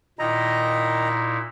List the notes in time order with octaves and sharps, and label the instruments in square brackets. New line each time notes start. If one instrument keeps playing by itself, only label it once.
[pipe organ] A#2 D#4 E4 [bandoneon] D#3 D#5 A#5